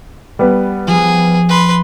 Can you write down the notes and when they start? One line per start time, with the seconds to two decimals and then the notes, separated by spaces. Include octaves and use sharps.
0.39 G3 B3 B4
0.87 F3 G#4
1.49 B4 C6